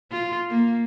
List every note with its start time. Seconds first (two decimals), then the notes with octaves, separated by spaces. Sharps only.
0.11 F4
0.50 A#3